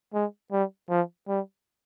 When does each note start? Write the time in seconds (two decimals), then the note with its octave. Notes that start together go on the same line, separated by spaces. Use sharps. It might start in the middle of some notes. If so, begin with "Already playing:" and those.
0.14 G#3
0.52 G3
0.90 F3
1.28 G3